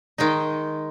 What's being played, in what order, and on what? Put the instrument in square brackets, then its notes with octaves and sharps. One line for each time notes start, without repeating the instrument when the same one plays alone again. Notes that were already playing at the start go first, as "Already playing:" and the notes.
[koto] D#3 G#3 D#4